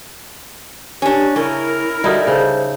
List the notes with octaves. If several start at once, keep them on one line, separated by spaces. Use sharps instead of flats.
C#4 D4 G4
C#3 C#4 E4 A#4
D3 G3 D#4 E4 F#4
C#3 A4 C5